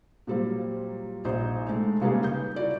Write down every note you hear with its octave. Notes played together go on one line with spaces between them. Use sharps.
A#2 F#3 G3 C4 F4
A#1 D#4 C5
G#3 A3
C#3 G3 A#3 B3 D#4 G#4
G6
E4 F#4 D5